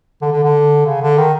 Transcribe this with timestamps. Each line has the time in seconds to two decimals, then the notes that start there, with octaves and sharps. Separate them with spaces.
0.22 D3
0.32 D3
0.44 D3
0.86 C#3
1.02 D3
1.18 D#3